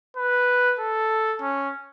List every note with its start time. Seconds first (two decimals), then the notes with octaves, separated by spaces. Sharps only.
0.16 B4
0.79 A4
1.41 C#4